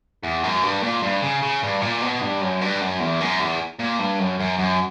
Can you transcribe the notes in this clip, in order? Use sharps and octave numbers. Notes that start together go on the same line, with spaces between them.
E2
F#2
G2
A#2
G2
C#3
C#3
G2
A#2
B2
G2
F#2
G2
F#2
E2
F#2
E2
A#2
G2
F#2
F#2
F#2